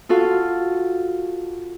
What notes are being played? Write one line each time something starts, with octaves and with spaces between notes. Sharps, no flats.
F4 F#4 A4 F5